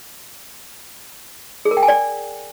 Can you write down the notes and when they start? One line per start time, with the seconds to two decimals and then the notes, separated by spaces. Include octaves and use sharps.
1.65 G#4
1.71 A#4
1.77 G5
1.83 G#5
1.88 D5